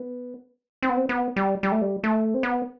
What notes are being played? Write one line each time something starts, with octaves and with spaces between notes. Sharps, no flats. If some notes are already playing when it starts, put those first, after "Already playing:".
Already playing: B3
C4
B3
C4
B3
G3
G3
A3
G3
A3
C4
B3